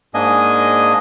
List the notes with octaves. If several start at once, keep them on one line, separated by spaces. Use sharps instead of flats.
G#2 A#3 D4 D#5 G#5